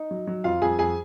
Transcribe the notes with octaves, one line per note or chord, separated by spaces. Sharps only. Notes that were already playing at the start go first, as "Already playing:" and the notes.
Already playing: D#4
F#3
F#3
F2 F4 F5
F2 G#4 G#5
F2 G#4 G#5